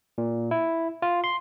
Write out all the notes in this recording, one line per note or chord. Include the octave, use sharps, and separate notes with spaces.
A#2
E4
F4
C6